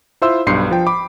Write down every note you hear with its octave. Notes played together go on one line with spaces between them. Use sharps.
E4 F4 C5 E5 C6 E6
B1 G2 C6 G6 C7 C#7
F3 G5
B5 D6